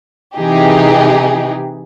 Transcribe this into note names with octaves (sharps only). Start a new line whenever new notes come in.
C3 E3 D#4 G4 G#4